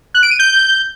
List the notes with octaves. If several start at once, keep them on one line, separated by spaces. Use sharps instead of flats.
F#6
D7
D#7
G6